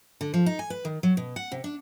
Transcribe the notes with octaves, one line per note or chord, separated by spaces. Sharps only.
D3
F3
D#4
G#5
B4
D#3
F#3
B2
F#5
C3
D4